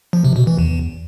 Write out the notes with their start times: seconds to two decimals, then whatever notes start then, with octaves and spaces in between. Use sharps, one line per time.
0.13 F3
0.25 C3
0.36 B2
0.47 E3
0.59 E2